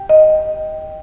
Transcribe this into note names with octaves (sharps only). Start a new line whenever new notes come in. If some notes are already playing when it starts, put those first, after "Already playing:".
Already playing: G4
D#5